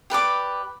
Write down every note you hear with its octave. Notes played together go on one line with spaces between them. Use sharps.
G4 B4 D5 D6